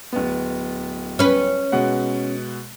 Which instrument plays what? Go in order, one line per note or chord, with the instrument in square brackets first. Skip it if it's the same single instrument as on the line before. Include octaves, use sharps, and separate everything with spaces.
[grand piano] D1 B3
[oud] C#4 B4
[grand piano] B2 G#3 F#5